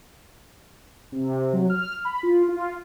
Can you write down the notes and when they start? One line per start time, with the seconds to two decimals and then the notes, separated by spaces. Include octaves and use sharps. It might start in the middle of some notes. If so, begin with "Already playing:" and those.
1.12 C3
1.53 F#3
1.70 F6
2.05 B5
2.23 F4
2.49 F4